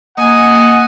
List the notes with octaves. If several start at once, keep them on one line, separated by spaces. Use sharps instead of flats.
A#3 D#5 F#5 G#5